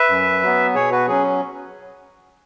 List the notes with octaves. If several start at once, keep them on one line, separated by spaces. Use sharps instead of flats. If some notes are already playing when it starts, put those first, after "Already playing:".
Already playing: B4 E5
F#2
F#3 B3
B2 G#4 C#5
F#4 B4
F#3 C#4 G#4